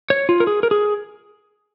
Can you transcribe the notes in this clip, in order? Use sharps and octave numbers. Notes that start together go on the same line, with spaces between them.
C#5
F4
A#4
G#4
A#4
G#4